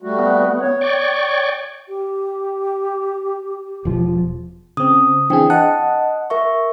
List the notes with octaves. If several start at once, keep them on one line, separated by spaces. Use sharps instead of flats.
G3 A3 F#4
B3
C#5
D5 G5 C#6
G4
E1 F3
C#3 C4 D#6
E3 C4 D4 G#4 G5
D#5 F#5 A5
A#4 E5 C#6